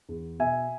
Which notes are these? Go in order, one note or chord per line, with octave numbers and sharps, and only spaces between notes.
E2
B2 E5 G#5